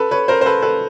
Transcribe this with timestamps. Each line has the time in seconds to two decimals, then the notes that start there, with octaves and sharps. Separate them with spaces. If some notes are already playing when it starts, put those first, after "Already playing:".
Already playing: A4 B4
0.11 B4 C#5
0.28 A#4 C5
0.41 C5
0.46 A4 B4
0.62 A4 B4